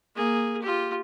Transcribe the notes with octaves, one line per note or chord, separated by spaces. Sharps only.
A#3 G#4
F4 G4